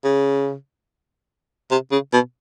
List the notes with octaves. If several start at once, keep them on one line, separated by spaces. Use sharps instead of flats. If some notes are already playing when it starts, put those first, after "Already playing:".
C#3
C3
C#3
B2